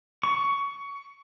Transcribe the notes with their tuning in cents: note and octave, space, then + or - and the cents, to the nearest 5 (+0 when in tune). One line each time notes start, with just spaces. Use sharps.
C#6 +15